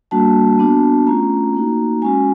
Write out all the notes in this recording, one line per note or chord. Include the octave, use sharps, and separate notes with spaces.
G3 A#3 D4 F#4 A5
B3 D4 F#4
A3 C#4 F4 A#5
A#3 D#4 F#4
G#3 C#4 F#4 G#5